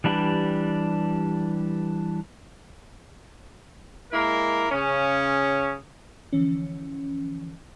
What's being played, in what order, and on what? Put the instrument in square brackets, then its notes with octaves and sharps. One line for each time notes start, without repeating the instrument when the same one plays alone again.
[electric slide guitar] E3 G3 D4 E4 G4 B4
[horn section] G#3 A#3 E4 A#4
C#3 C#4
[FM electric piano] D3 E3 F3 C#4